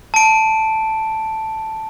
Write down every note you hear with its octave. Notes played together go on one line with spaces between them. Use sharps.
A5 D7